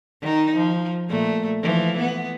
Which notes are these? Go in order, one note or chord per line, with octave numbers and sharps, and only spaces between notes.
D#3 D#4
F3
A#2 A3
E3 F3
B3